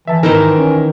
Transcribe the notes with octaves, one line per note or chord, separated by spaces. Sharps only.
E3 E5 A5
G#2 D#3 E3 D#4 A#4 C5
C#4